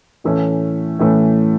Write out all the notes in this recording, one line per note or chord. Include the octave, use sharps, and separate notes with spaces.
A2 E3 A3 C#4
A2 E3 A3 C#4